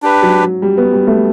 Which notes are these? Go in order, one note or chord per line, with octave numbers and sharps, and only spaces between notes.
D4 G4 B4
F#3
F#3
G3
B3
G3
A3